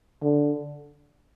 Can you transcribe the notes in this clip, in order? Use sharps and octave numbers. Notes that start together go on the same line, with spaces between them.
D3